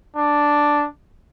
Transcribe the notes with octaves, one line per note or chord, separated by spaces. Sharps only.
D4